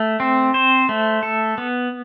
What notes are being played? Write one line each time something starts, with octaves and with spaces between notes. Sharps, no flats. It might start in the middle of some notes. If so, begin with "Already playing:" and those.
Already playing: A3
C4
C5
A3
A4
B3